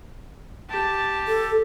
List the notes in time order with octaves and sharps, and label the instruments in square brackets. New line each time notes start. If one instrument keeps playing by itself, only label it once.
[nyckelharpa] G4 A5
[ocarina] A4